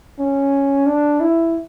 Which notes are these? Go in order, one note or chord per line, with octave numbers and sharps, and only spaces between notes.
C#4
D4
E4